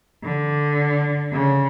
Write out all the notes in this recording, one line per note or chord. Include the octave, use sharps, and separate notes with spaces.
D3
C#3